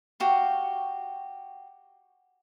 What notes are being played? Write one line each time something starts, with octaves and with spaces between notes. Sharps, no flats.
F#4 G4 F5